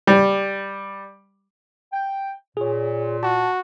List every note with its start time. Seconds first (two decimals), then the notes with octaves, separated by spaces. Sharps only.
0.07 G3
1.92 G5
2.57 A#2 G#4 C#5
3.23 F#4 A5